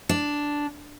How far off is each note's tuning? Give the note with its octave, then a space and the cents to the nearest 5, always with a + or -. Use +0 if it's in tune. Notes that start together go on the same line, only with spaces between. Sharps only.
D4 -5